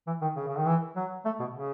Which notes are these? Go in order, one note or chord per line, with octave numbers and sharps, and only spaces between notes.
E3
D#3
C#3
C#3
D#3
E3
F#3
A3
B2
C#3